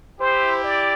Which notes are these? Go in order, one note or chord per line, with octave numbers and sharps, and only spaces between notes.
E4 G4 C5
D5